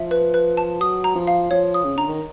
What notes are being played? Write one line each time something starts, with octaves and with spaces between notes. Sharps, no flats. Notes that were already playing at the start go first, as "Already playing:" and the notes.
Already playing: F3 E5
B4
B4
A5
F#3 D#6
A#5
F3
F5
F3 C#5
D#6
C#3
D3 A#5
D#3